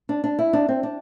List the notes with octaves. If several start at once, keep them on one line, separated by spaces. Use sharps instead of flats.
D4
D4
E4
D4
C4
D4